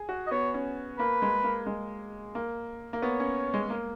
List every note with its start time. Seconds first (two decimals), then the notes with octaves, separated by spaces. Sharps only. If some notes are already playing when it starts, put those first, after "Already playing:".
Already playing: G#4
0.09 F#4
0.27 D#5
0.31 B3 C#5
0.54 C#4
0.99 A#3 B4
1.22 G#3
1.44 A#3
1.67 G#3
2.35 A#3
2.93 A#3
3.02 B3 C#5
3.20 C#4
3.54 G#3
3.70 A#3